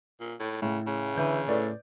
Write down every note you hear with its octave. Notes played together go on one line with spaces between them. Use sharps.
A#2
A2
A2 C#3
C#3
D3 E3 G6
A2 B4 D5